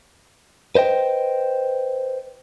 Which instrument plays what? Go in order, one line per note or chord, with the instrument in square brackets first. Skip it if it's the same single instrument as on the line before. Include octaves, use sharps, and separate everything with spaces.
[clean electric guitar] B4 C5 D#5 G5